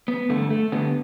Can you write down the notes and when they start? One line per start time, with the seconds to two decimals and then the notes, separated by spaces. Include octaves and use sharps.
0.08 B3
0.29 G2 D3 A3
0.50 A3
0.72 G2 D3 B3